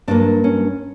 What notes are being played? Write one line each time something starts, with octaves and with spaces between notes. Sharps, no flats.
G2 F#3 A#3 D4
C#4